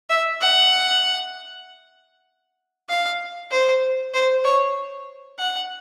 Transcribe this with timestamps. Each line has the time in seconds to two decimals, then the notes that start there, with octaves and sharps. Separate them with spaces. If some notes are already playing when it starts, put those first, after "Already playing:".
0.10 E5
0.41 F#5
2.89 F5
3.51 C5
4.14 C5
4.44 C#5
5.39 F#5